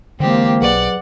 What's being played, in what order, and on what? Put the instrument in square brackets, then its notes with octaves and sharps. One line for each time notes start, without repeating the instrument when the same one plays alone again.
[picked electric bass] D3 E3 G#3 [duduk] A#3 [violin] C4 G4
[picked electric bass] B1 [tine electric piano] F#3 G#4 B4 [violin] D5 F#5